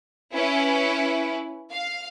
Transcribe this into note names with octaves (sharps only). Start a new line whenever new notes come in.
C#4 E4 B4
F5